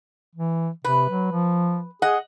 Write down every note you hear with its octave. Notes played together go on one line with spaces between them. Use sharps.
E3
C3 B4
F#3
F3
G#4 D#5 F#5